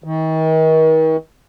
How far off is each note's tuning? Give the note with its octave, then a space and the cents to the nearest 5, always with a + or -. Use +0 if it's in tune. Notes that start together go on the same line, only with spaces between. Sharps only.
D#3 +40